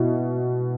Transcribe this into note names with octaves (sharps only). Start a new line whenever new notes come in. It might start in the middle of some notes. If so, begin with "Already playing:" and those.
Already playing: B2 E4